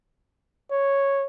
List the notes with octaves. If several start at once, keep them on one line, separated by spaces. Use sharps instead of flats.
C#5